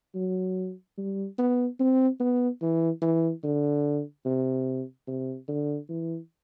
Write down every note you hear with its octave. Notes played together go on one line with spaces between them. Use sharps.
F#3
G3
B3
C4
B3
E3
E3
D3
C3
C3
D3
E3